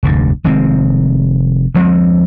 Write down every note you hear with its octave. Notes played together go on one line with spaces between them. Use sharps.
F1 D2 G2
F1 D#3 G#3 C4
D2 F3 G#3 C4